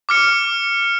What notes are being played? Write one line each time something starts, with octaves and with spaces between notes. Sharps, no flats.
D6 F6 C#7